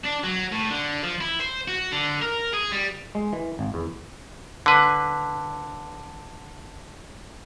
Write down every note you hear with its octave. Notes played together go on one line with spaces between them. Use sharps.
D4
F#3
A2
D3
F3
E4
C5
F#4
D3
A#4
G#4
G3
G#3
E3
G#1
E2
D3 B4